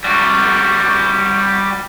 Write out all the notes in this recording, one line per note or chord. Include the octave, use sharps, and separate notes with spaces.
G3 F#4